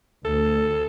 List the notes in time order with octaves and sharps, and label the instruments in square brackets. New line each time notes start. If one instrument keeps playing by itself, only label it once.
[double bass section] D2 [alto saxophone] A4